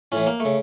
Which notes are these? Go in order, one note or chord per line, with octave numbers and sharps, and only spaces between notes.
A2 E3 C#4
A#3
A3
C#3